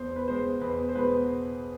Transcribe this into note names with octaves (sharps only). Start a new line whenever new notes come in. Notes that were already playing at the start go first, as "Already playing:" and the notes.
Already playing: E2 C5
B4
B2 G#3 C5
E2 B4
C5
B2 G#3 B4